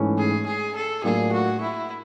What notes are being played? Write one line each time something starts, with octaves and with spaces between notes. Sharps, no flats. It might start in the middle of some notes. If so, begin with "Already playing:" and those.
Already playing: G#2 E3 A3 C#4
G#4
G#4
A4
A2 F#3 A#3 D4 F4 G#4
F#4
E4